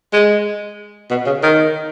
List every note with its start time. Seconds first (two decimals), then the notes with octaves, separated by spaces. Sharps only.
0.13 G#3
1.10 B2
1.26 C#3
1.43 D#3